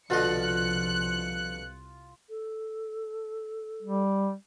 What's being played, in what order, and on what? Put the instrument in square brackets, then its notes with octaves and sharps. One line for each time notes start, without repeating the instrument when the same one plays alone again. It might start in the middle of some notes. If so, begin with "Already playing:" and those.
[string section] C2 F#6 C#7 [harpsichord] B2 D3 D#5 [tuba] F3 [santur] F4
[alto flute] A4
[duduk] G3